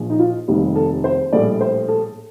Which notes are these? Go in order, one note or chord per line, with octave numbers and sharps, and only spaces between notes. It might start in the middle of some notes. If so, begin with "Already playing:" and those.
Already playing: A#1 A#2 F3
D#4
F4
F1 D#2 D#3 G3
A4
C5
A#1 A2 G3 D5
C5
A4